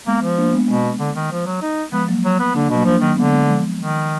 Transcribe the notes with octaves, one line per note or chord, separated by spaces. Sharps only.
G#3 A#3 B3
F3
A#3 D4
G#3 B3
B2 G#3 B3
D3
D#3
F3
F#3
D#4
F3 G#3 B3
F#3 A#3
F#3
B3
D3 A#3 D4
B2
F#3 A#3
F3 A#3 D4
D#3 F#3 A#3
D3 G#3 B3
G#3 B3
F3 G#3
D#3